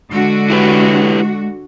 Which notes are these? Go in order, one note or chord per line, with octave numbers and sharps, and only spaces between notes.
D3 G#3 F#4
E4 G4 B4